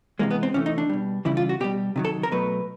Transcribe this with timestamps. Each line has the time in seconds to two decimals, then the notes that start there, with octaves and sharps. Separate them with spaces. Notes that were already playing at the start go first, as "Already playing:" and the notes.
0.19 C3 E3 G#3 A#3
0.31 B3
0.43 C4
0.54 C3 E3 A3 C#4
0.66 D#4
0.78 D4
0.90 B2 G3
1.25 C#3 E3 G3 E4
1.37 F4
1.49 F#4
1.60 B2 G3 G4
1.96 C3 D#3 F#3
2.05 A4
2.23 A#4
2.31 B2 F#3 A3 B4